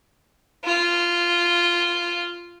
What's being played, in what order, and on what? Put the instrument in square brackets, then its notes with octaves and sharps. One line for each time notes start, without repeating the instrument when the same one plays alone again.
[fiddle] F4